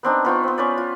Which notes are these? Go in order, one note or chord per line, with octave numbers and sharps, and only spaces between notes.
B3 C4 D4 D#4
B3 F4 G5 C#6
B3 C4
C#4 B4 D5
F4